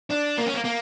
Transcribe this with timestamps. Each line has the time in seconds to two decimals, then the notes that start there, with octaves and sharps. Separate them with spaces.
0.11 D4
0.38 A#3
0.47 C#4
0.55 A#3
0.65 A#3